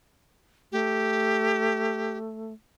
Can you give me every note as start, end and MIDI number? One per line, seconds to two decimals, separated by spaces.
0.72 2.53 57
0.72 2.18 67